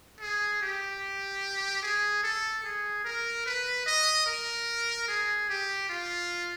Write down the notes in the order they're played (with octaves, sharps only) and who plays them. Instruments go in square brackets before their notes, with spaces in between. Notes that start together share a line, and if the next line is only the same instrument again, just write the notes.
[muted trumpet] G#4
G4
G#4
A4
G#4
A#4
B4
D#5
A#4
G#4
G4
F4